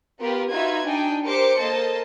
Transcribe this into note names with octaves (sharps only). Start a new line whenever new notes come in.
B3 F4 G4 A#4 B4
D#4 F4 F#4 B4 E5 G#6
D4 D#4 G5 G#5
G4 A#4 C5 D6 C#7
A#3 A4 C5 D#5 A5